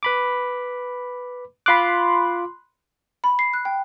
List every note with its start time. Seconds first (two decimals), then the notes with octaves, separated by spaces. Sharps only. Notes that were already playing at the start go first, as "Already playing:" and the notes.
0.03 B4 B5 D6
1.66 F4 B5 C6 D6 F#6
3.24 B5
3.39 C7
3.53 F#6
3.65 G5